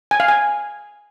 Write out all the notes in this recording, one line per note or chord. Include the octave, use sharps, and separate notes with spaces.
G#5
F5
G#5